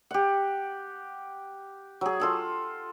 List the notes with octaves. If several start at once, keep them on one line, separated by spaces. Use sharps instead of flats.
G4 F#5
F#3 G#4
F4 A4 F#5